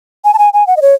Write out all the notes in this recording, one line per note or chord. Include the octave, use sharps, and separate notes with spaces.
G#5
A5
G#5
G#5
F#5
D#5
C#5